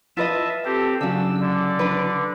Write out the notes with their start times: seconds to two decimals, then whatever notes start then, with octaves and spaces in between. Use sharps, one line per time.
0.17 F4 B4 D#5 E5 A5
0.65 C4 G4 A4
1.01 C#3 F#3 D4 E6
1.40 D3 D5
1.79 D4 B4